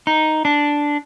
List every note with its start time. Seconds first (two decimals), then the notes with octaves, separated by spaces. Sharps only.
0.07 D#4
0.45 D4